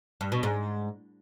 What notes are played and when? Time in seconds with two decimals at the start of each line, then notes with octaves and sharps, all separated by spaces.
0.21 G2
0.32 B2
0.43 G#2